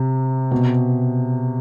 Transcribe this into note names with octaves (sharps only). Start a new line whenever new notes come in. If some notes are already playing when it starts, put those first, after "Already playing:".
Already playing: C3
B2